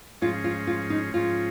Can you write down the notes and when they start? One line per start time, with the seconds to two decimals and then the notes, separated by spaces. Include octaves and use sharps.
0.22 G#2 F3 G#3 C#4 F4
0.44 F4
0.67 F4
0.90 D#4
1.14 G#2 F3 G#3 C#4 F4